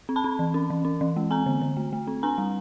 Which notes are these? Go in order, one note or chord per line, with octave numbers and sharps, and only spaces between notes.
C4
A5 B5
C4
E3
C#4
E3
C#4
E3
G#3
C4 G#5 A#5
D3
D3
A3
A3
C4
D4 G#5 A#5
G3